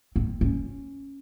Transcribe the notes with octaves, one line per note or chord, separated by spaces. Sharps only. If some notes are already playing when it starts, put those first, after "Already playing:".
C4
C#4